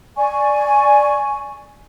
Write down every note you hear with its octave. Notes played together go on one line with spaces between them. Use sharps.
D5 G#5 C#6